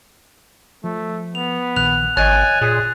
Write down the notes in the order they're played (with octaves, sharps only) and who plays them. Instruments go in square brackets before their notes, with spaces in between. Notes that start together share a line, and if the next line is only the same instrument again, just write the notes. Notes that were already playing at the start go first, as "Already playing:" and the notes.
[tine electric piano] F3 [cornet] A3
[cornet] B3 [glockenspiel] F7
[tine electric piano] A#1 D#3 [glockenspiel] F#6 F7
[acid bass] G#1 [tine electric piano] C#5 D#5 [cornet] G#5 [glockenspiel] F#6 A6
[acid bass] A#2 [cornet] G#4